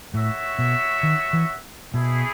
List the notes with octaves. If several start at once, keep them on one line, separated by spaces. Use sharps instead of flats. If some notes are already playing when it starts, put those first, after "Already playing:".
A2 F#4 C#5 E5
B2
D#3
E3
B2 A3 E4 G#4